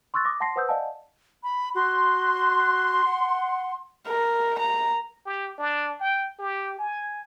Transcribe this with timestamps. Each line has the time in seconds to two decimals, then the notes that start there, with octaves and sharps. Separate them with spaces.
0.14 C6 C#6 E6 F#6 A6
0.25 D6 D#6 A#6
0.40 F#5 A5 C6 A#6 C7
0.56 B4 C5 F#5 D#6 E6 G6
0.69 D5 D#5 F5 F#5 G#5 A5
1.43 B5
1.75 F#4 C6
3.05 F#5
4.07 A#4
4.59 A#5
5.26 G4
5.58 D4
6.00 G5
6.39 G4
6.79 G#5